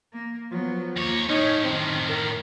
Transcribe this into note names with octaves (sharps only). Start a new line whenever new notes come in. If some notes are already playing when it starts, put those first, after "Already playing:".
A#3
F3 F#3 B3
D#2 A#3 C#5
A2 C#4 D#4 C#5
F#2 D#3 C4
A#4